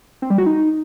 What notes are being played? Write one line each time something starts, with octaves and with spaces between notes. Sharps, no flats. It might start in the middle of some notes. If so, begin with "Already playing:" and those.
C4
G3
F#4
D#4